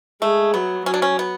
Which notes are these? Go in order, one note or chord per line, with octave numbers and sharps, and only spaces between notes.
G#3 A3
F#3 B3
F#3 C#4
D4
C#4
B3